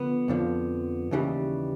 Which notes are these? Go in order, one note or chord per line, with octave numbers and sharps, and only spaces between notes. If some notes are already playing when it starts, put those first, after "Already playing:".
Already playing: D3 F3 B3
F2 D3 F3
D#2 C#3 E3 G3